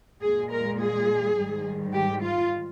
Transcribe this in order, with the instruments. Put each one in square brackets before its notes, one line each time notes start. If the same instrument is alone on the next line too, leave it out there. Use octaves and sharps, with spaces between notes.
[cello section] A#2 G#3 G#4
A#4
G#4
G#2 D#3 G3
G4
F4